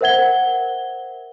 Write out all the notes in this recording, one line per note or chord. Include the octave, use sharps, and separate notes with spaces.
A#4 C5 E5 F#5 G#6 G7